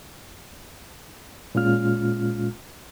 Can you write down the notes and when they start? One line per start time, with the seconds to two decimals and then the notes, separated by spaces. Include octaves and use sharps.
1.55 A#2 G#3 C#4 F4 F6